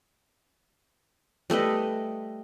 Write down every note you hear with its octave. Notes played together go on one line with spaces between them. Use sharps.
G3 A3 B4 D#5